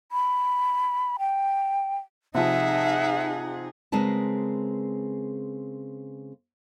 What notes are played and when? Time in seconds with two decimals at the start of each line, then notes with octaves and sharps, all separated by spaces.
0.12 B5
1.19 G5
2.35 C3 F3 D#4 G#4 E5 F#5
3.92 C#3 G#3 C4 A#4 B4 A5